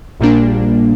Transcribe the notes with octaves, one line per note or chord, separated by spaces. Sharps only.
A#1 A#2 G3 A#3 D4